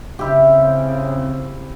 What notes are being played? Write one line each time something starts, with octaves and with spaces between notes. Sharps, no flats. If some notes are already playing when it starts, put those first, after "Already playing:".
C#3 C4 E4 G4